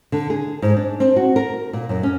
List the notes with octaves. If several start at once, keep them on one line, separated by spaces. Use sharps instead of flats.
D3
G#4
G#2
D4
C4
F#4
A#4
A#2
F#2
C#4